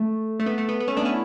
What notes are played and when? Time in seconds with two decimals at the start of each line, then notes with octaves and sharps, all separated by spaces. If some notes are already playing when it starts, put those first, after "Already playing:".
Already playing: A3
0.39 A3
0.46 B3
0.58 A3
0.69 B3
0.80 B3
0.88 A3 C#4
0.97 B3 D4
1.05 C#4 E4